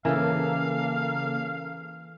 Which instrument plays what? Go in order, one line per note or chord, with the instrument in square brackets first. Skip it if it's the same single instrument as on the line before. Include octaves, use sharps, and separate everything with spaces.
[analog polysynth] C#3 A#3 A4 [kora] E3 [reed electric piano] C#4 A#4 [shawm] F5